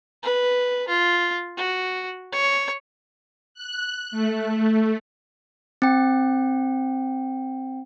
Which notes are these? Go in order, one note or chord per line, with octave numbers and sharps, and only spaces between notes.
B4
F4
F#4
C#5
F#6
A3
C4 G5